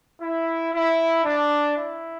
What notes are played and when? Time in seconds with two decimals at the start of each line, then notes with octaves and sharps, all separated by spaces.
0.21 E4
0.73 E4
1.24 D4
1.77 E4